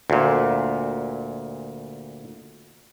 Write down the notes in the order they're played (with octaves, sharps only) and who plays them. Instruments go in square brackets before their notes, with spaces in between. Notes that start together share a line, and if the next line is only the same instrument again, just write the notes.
[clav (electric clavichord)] D2 A#2